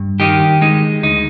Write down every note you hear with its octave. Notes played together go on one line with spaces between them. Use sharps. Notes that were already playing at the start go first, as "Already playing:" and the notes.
Already playing: G2
D#3 D#4 G4
G#3 D#4
D2 D#4